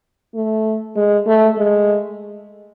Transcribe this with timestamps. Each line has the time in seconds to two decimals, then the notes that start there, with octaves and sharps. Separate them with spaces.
0.35 A3
0.96 G#3
1.27 A3
1.57 G#3